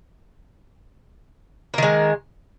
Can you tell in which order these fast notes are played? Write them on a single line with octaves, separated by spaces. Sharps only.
A#3 D#3 G#3